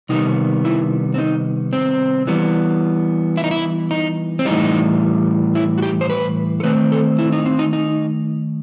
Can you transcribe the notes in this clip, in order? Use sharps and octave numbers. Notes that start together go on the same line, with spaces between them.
C3 D#3 G3 B3 D#4
E4
C4
D#4
C4
E3 G3 B3
E4
D#4
E4
D#4
C4
A2 E3 G3 D#4
E4
F#4
G4
C5
B4
A4
D#3 A3 C4 B4
A4
E4
D#4
C4
D#4
D#4